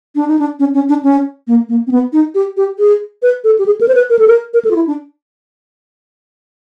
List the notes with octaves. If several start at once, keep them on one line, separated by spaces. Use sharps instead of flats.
D4
D#4
D4
C#4
C#4
D4
C#4
A#3
A#3
C4
B3
D#4
G4
G4
G#4
B4
A4
G4
G#4
A#4
C5
B4
A#4
A4
A#4
A#4
A4
F4
E4
D4